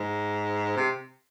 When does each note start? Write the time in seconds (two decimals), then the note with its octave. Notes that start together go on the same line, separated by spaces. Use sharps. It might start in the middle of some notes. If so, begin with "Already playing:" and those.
Already playing: G#2
0.77 C3